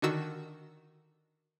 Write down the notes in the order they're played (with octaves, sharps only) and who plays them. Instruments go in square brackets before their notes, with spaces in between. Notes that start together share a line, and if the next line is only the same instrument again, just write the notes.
[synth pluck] D3 D#3 F#4 E6